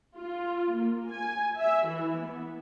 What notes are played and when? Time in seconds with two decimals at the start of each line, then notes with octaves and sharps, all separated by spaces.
0.17 F4
0.74 A#3
1.10 G#5
1.58 E5
1.88 E3
2.19 B3